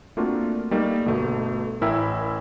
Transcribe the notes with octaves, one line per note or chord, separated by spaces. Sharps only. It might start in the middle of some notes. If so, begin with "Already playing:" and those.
A3 A#3 C4 D4 F4 F#4
G3 A3 A#3 D#4 D5
G1 B2 A3
A1 E4 A#4 E5 G5 E6